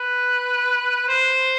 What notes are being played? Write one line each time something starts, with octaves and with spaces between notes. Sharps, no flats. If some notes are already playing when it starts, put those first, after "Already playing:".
Already playing: B4
C5